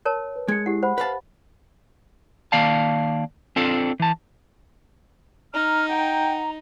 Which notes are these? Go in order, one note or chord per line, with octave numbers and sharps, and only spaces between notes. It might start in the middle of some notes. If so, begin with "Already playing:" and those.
A#4 C#5 A5
B4
G#3 G#6 C#7
E4 G4 F#5
C5 F#5 B5
B4 F5 A5
D#3 A#3 D5 F5 A5
C4 D4 F4 A4
E3 A5
D#4 A#5 F6
F#5 G5